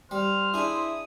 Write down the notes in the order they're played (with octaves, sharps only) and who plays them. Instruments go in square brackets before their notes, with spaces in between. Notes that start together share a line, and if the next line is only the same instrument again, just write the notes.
[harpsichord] G3 [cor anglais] C5 [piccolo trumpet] F6
[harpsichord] D4 G#4 [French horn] E4 [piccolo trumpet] D#6